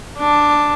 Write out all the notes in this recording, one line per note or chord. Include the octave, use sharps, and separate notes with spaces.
D4